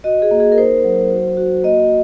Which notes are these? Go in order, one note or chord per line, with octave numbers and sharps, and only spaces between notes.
F#4 D#5
G#4
A#3
G#4
A#4
D#4 C5
F#3
F#4
F#4
A#3 D#5